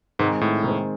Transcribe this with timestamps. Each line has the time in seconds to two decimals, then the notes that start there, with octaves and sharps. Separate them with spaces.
0.19 G#2 D#3 G#3 C4
0.41 A2
0.64 D#3 G#3 C4